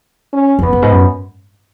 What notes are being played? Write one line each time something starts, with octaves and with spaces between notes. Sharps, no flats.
C#4
F#2
E2 B3
F#2
G#2
F#2